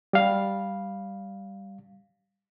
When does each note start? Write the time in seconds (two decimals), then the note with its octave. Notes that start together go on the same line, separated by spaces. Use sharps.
0.13 G3 F5